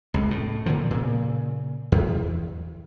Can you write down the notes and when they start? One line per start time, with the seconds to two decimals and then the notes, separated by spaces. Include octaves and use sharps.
0.14 C#2 F#2
0.31 A2
0.66 A#2 D3 D#3 F3
0.91 A#2 C#3
1.92 E2